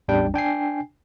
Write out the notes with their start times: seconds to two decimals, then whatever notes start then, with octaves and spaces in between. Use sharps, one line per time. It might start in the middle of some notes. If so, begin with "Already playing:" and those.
0.08 A1 E2 G3 D4 G5
0.34 D4 G5 G#5 C7